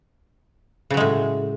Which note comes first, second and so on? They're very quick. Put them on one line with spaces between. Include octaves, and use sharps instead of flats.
C#3 F#3 G#3 A2